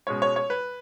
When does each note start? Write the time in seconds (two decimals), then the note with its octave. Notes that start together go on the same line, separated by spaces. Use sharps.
0.07 B2 G#3 C#4 C#5
0.22 C#5
0.36 C#5
0.50 B4